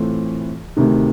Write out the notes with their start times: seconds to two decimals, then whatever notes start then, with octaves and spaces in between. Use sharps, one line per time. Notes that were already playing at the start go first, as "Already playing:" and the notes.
Already playing: A2 E3 A3 C4 F4
0.77 D2 C3 D#3